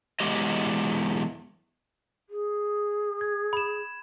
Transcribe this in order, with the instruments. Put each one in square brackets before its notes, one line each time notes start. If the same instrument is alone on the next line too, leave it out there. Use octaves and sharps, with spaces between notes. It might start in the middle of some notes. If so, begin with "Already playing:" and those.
[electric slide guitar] E2 F#3 G#3 G4 D#5
[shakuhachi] G#4
[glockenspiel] G#6
B5 E7